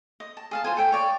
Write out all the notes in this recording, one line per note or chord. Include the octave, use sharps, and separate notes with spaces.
D#5
A5
G#4 F5 A5
F4 C5 G#5
A4 G5 G#5 B5
C#5 D5